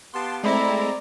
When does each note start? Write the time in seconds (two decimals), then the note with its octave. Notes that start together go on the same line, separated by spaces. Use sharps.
0.14 B3 G4 F5 A5 C6
0.43 G#3 A3 C4 E4 D5 A#5